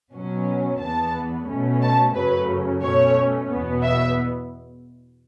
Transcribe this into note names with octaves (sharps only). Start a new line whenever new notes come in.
B2 F#3 C#4
E2 E3 B3 A5
B2 A3 C#4
A5
F#2 C#3 F#3 A3 C#4 B4
B2 A3 C#4 C#5
E2 B2 B3
E5